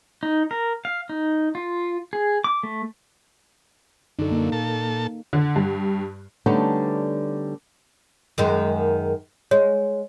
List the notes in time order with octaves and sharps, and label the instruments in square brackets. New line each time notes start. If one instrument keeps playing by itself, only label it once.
[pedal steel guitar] D#4
A#4
F5
D#4
F4
G#4
D6
A3
[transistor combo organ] F#2 D3 [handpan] D#4 A4
[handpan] A#3
[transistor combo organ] A#2 A4 A5
[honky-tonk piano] D3
G2
[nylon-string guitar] D3 G3 A3 B3 C#4 D#4
[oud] F#2 D#3 G#3
[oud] G#3 [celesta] C#5